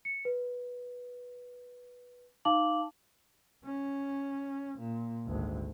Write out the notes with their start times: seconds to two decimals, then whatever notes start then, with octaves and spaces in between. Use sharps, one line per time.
0.05 C#7
0.25 B4
2.45 D#4 F5 A5 D6 F#7
3.65 C#4
4.79 A#2
5.26 G#1 D2